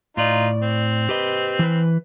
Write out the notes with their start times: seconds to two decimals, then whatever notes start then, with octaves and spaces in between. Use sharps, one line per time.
0.17 A2 D#4 F4 D5
0.63 C4
1.09 G4 B4 D#5
1.59 E3 B4